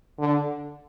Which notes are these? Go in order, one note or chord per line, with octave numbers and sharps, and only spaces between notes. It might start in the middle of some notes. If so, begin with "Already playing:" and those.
D3